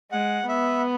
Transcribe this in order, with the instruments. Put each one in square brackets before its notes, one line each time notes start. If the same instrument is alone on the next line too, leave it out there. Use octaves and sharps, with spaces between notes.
[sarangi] G#3 [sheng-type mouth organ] F#5
[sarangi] B3 [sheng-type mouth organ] E5